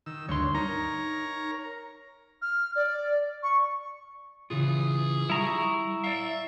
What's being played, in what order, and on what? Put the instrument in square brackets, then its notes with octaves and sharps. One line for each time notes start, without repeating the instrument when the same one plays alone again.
[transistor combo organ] D#3 E6
[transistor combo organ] D2 C#5 [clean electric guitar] G2 C6
[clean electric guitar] D#4 [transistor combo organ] A#4 C#5 A#5
[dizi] F6
D5
C#6
[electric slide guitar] C#3 E3 F4 [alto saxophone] G#4
[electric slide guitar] G3 [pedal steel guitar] E4 A#5 C#6
[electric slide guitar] D5 F5 [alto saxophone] E5